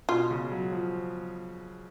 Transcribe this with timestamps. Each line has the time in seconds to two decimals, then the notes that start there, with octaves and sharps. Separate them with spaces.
0.09 B2 F4
0.30 C#3
0.52 F#3
0.72 F3